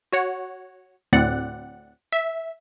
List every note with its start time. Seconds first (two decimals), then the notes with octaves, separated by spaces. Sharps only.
0.13 F#4 C#5 F#5
1.13 D2 A2 C4 D5 F#5 F#6
2.13 E5